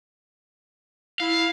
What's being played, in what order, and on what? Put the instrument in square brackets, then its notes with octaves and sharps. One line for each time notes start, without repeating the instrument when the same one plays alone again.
[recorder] E4 [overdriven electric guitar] F5